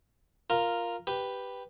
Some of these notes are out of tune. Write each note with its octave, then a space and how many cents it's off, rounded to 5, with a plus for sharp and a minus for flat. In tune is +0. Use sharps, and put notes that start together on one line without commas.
F4 -5 A#4 +0
G4 +0 B4 +0